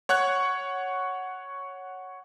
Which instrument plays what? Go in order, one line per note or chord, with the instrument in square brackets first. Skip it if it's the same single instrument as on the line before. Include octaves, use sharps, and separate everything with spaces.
[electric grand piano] C#5 F#5 C#6 F#6 G#6